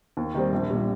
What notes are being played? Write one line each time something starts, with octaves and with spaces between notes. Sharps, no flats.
D#2
D#3 G3 C4
A#1
A#2 G3